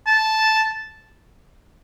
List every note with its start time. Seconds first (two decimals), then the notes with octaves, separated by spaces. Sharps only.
0.07 A5